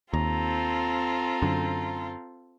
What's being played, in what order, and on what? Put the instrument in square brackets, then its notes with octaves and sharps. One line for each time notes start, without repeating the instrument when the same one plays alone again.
[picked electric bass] D#2 [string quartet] C4 F4 A4 [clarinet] A#5
[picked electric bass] F#2 D3